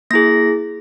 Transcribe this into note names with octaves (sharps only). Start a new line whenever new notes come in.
A#3 E4 G#4 A#6